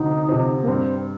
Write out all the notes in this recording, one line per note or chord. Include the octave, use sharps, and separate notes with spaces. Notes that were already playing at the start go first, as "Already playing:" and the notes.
Already playing: D2 C3 F3 C4 D#4
C3 F3 C4
A#3
G2 C4